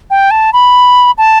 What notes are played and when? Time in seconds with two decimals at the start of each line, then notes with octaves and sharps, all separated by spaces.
0.10 G5
0.31 A5
0.53 B5
1.18 A5